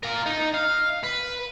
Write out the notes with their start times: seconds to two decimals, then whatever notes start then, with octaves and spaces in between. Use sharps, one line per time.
0.03 F4 A#4
0.26 D#4
0.54 F5
1.04 B4